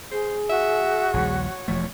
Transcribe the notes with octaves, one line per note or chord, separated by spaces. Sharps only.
G#4 C5
F#4 E5
A#1 D#2 G3 C#5
E1 F3 A3 C#5